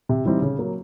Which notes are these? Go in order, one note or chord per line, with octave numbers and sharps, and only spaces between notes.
C3
E3 G3 C4 D#4
C#3
F#3 A#3